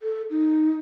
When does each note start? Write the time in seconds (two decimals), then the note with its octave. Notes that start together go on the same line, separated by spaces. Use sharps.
0.02 A4
0.30 D#4